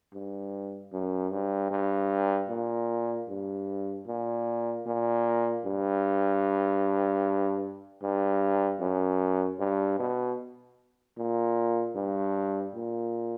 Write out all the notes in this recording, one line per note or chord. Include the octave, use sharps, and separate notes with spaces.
G2
F#2
G2
G2
A#2
G2
A#2
A#2
G2
G2
F#2
G2
B2
A#2
G2
A#2